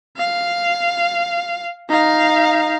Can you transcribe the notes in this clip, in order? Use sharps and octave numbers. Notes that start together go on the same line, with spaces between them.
F5
D#4 F5